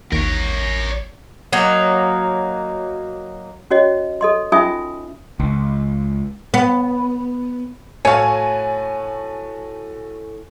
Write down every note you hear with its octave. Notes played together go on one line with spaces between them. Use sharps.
A1 D#2 A#4 C#5
F#3 A#3 D#4
C#4 F#4 C#5 D#5
A4 D#5 C6
C#4 D#4 F4 E5 G#5 D#6
C#2
B3
A2 A3 F#4 C#5 F5 G#5